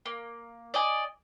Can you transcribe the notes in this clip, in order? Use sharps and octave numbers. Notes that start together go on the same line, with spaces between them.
A#3
D5 D#5 G#5